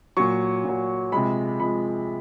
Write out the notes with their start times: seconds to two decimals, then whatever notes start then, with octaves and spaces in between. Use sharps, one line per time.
0.17 A#2 F#3 C#6
0.65 A#2 F#3
1.12 C3 F3 G#3 B5
1.60 C3 F3 G#3 B5